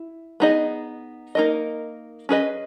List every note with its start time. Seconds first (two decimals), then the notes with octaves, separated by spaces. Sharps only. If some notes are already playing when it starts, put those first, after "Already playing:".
Already playing: E4
0.40 B3 D#4 G#4 D#5
1.35 A#3 D#4 A#4 D#5
2.29 C#4 G#4 B4 D#5